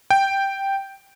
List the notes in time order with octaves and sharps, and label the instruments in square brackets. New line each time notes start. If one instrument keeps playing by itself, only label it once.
[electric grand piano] G5